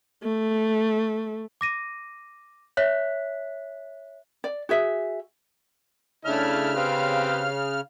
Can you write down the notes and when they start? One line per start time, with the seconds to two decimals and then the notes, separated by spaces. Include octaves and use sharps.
0.24 A3
1.61 D6 A#6 D#7
2.77 C#5 E5 F#6 B6
4.44 D5
4.69 F#4 G#4 E5
6.25 C#3 A3 D4 E4 E5 F6
6.76 C4 G4 B4 F5